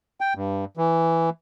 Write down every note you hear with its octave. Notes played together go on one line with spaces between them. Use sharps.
G5
G2
E3